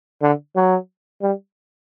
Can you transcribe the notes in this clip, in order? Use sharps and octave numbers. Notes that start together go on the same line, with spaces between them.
D3
F#3
G3